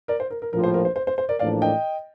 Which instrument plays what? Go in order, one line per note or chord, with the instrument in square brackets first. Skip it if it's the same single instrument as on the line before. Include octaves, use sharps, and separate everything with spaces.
[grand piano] A#4 D5
C5
A#4
A#4
[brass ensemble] A#1 A2 F3 [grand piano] A#4
[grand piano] C5
A#4
C5
C5
C5
C5
A#4 D5
[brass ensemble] A1 A2 F3 A#3 D4 [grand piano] D5 F5
[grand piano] D#5 G5